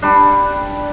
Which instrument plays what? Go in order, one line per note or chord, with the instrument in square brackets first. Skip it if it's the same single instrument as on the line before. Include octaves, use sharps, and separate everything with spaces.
[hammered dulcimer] G3 D4